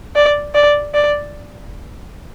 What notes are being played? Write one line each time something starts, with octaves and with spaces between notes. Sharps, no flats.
D5
D5
D5